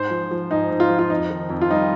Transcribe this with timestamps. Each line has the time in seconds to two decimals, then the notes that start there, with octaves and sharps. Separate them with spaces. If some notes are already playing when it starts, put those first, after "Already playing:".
Already playing: G#2 C5
0.10 F3
0.31 F3
0.50 G#2 D#4
0.70 G#2
0.80 F4
0.90 F3
0.99 F4
1.10 F2 D#4
1.30 D#3
1.50 F2
1.61 F4
1.70 G3 D#4